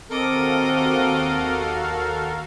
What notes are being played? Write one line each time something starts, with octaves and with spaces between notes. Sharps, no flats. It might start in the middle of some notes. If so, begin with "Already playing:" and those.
D#2 C4 F#4 A4 A#4 D#5 F5 D6